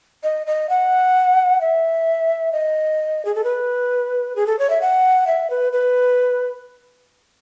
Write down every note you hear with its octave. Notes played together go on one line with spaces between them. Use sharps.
D#5
D#5
F#5
E5
D#5
G#4
A4
B4
G#4
A4
C#5
E5
F#5
E5
B4
B4